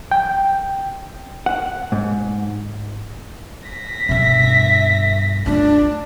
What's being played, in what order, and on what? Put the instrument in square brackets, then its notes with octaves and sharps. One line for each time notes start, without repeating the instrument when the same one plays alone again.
[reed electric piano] G5
[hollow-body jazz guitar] F#5
G#2
[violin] A#6 B6
[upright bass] G2 B2 [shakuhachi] E5
[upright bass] A3 F4 [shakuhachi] D4